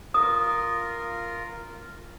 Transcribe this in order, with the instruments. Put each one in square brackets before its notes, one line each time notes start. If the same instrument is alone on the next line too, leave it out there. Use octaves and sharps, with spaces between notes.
[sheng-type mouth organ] F4 A#4 [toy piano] D#6